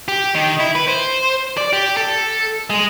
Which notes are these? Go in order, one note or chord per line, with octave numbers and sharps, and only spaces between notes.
G4
D#3
E4
B4
C5
D5
G4
A4
G#3